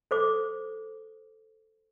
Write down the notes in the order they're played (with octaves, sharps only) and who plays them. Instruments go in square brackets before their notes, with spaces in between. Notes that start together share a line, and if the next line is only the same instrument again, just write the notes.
[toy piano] A4 C5 D6